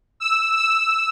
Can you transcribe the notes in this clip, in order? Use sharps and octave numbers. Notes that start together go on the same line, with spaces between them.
E6
E6